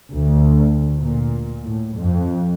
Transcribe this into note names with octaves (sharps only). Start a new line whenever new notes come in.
D2
A#2
A2
F2